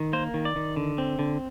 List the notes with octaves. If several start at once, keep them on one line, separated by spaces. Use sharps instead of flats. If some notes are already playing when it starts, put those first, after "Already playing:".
Already playing: D#3
A#3 C5
D#3
D5
D#3
D3
C4
D3